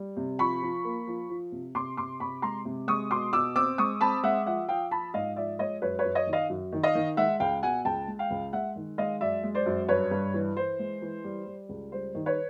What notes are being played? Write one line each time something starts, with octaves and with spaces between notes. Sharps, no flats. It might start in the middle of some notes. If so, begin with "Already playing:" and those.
Already playing: G3
C3
F3 B5 C#6
F3
A#3
F3
F3
C3
C3 C6 D6
C3 C6 D6
C3 B5 C#6
G#3 A#5 C6
C3
G#3 C#6 D#6
B2 C6 D6
B2 D6 E6
C4 D6 E6
G#3 C#6 D#6
C4 A5 B5
G#3 E5 F#5
F3 E5 F#5
F3 F5 G5
F3 A5 B5
G#2 D#5 F5
F3 D5 E5
G#3 C#5 D#5
F#2 B4 C#5
B4 C#5
F#2
C#5 D#5
D#3
D#5 F5
F#2
D#3
D#5 F5
D#3
G#3 E5 F#5
C#2 F5 G5
B2 F#5 G#5
C#2 G5 A5
G#3
F5 G5
C#2
G#3 E5 F#5
D#3
G#3 D#5 F5
F#2 D5 E5
G#3
C5 D5
F#2
G2 B4 C#5
G2
E3
E3 C5
G#3
E3
G3
G3
C#2
G3 C5
D#3
B4 C#5